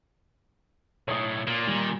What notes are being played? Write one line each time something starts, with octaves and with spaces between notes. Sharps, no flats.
B1 A2 C#5 D#6
A#2 A#3 F4
D#3 G3